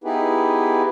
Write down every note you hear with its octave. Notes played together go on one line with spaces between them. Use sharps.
B3 D#4 E4 G4 G#4 B4